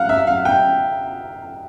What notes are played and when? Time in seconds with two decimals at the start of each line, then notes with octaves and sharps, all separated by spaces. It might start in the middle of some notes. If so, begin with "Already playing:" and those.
Already playing: F5 F#5
0.09 E5
0.27 F5
0.45 G5